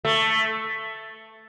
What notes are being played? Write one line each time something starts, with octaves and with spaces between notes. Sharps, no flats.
A3